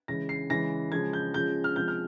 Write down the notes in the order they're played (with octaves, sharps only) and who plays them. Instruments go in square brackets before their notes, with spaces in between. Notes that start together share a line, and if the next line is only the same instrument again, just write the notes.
[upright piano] C#3 E3 G#3 A#6
C7
C#3 E3 G#3 A#6
C#3 F3 G#3 G#6
G6
C#3 F3 G#3 G6
F6
C3 F3 G#3 G6
F6